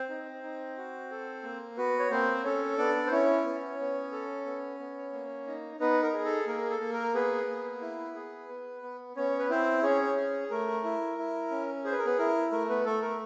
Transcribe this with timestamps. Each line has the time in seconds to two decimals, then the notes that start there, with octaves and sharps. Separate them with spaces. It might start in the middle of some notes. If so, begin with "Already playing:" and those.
Already playing: C4 C5
0.09 D#4
0.43 D#4
0.77 F#4
1.11 A4
1.43 A#3
1.77 B3 F#4 B4
1.99 C#5
2.11 A#3 C4 C5
2.44 C#4 A4 C#5
2.78 B3 D4 D5
3.07 C5
3.11 C#4 E4 C#5
3.45 B3
3.79 B3
4.12 A4
4.46 B3
4.79 B3
5.13 A#3
5.47 D#4
5.80 B3 D#4 B4
6.03 A#4
6.13 G#4
6.25 A4
6.47 A#3 A#4
6.70 A4
6.80 A#3
6.93 A#4
7.14 B3 G#4 B4
7.48 A#3
7.81 E4
8.15 G#4
8.49 B3
8.82 B3
9.16 B3 C#4 C#5
9.39 B4
9.49 C4 E4 C5
9.83 C#4 G#4 C#5
10.16 G#4
10.50 A3 A#4
10.84 E4
11.18 E4
11.51 C#4
11.85 G#4 C5
11.92 B4
11.98 A#4
12.05 B3 B4
12.18 E4 A#4
12.52 A3 A#4
12.69 B3 B4
12.85 A3 A4
13.02 A#4